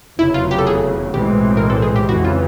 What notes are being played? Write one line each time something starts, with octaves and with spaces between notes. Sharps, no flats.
F1 E2 C#3 F#3 E4
F4
G4
A4
G#4
B1 A2 E3 G#3 C4 G4
A#4
A4
G#4
G4
F2 C#3 E3 F#4
F4